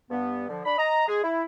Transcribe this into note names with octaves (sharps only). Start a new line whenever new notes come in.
G2 B3
D3 F3
D4 B5
D#5 A#5
G#3 G#4
E4